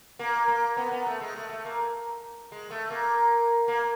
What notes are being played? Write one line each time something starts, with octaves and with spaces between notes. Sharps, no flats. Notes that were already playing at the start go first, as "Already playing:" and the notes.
A#3
A#3
B3
B3
A3
G#3
A3
A3
A#3
G#3
A3
A#3
A#3